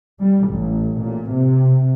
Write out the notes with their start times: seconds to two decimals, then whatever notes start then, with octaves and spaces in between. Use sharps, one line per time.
0.21 G3
0.50 A1
1.01 A#2
1.32 C3